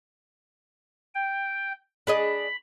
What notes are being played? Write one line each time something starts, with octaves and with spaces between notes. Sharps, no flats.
G5
D4 G#4 D#5 B5